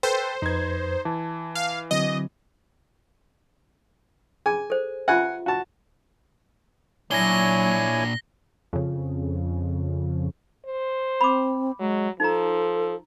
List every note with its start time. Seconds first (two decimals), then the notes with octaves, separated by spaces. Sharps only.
0.03 A4 B4 C5 G5
0.42 F2 D#4 B4 G#6
1.05 E3 A5
1.55 F5
1.91 D3 F#3 C4 D#5
4.46 G#4 G#5
4.70 A4 C5
5.08 F4 G4 E5 F#5 G#5 F#6
5.46 F#4 A5
7.11 A#2 F#3 D4 E4 C#5 G#5 A#6 G7
8.73 F2 C#3
10.66 C5
11.21 C4 B5 D6
11.79 F#3 G#3
12.20 F3 D#4 A4 A#5